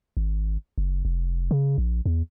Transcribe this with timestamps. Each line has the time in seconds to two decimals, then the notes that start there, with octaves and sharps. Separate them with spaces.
0.17 G#1
0.78 F#1
1.05 F1
1.51 C#3
1.78 A#1
2.06 E2